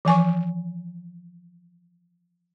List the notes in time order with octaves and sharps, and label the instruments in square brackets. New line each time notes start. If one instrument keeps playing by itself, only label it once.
[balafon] E3 F3 G#5 C#6